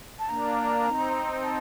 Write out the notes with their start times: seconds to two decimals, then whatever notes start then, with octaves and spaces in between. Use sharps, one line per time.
0.19 A5
0.29 A#3 D4 A#5
0.85 C4 D#4
1.43 A5